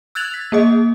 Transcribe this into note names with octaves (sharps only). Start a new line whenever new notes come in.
E6 F#6 G#6 A6 F7 F#7
B6
A#3 G#4 D#5